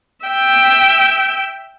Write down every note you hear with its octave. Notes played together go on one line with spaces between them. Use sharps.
E5 G5